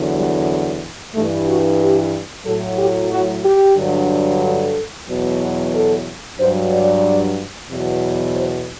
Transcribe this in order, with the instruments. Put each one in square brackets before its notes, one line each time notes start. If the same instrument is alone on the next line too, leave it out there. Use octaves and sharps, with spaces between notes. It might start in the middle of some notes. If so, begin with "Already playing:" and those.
Already playing: [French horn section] E2 D3 F#3
G3
G2 E3 A3
F#4
G4
A2 F#3 A4
G4
F#4
G4
G2 D3 F#3
A4
E2 B2 F#3
A4
G2 F#3 C5
D5
E2 B2 F#3
C5